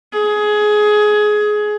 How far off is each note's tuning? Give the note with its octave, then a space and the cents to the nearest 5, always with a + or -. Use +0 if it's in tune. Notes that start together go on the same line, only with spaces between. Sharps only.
G#4 +20